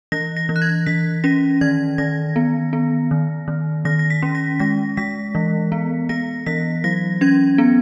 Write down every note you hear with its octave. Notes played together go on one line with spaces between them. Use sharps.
E3 A#6
A#6
E3
F#6
G#6
E3 B6
C#4 A#6
D#3 G#6
D#3 A#6
B3
B3
D#3
D#3
D#3 A#6
A#6
B6
C#4
A#6
G#3 A#6
G#3 B6
E3
B3
B3 A#6
E3 B6
F#3 A#6
C#4 G#6
B3